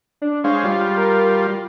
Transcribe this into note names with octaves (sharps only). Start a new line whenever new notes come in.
D4
G#3 C5 C#5 F5
G3 F4
A#4